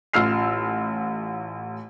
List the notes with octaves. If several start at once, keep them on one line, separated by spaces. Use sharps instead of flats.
A1 F4 E6 F6 C7